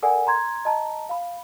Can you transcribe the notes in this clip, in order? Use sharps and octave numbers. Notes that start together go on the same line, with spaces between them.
A4 A#4 D5 F#5 G#5
A#5 C6 G#6
D#5 A5 A#5
F5 B5